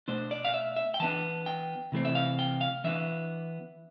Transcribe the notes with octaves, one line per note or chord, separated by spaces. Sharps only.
B2 A3 D4 C5
D5
F5
E5
E5
G5
E3 B3 D4 A5
G5
C3 E3 A3 C4
E5
F5
G5
F5
E3 B3 D4 E5